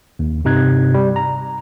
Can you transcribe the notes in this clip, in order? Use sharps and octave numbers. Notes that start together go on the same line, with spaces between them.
D#2
G2 C3 D#4 F#6 G#6
G3
A#5